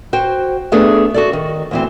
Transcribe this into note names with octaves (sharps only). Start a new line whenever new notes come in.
F#4 C5 G5
A3 B3 D4 G#4 A4
F#4 A4 D5
D#3
D2 E3 C4